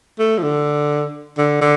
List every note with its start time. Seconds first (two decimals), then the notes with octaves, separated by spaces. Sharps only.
0.19 A3
0.38 F3
0.43 D3
1.38 D3
1.61 D3